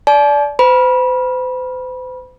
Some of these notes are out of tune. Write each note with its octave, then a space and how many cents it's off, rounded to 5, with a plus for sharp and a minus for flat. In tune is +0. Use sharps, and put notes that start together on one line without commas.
D5 -15 A5 -45
C5 -40 B5 -25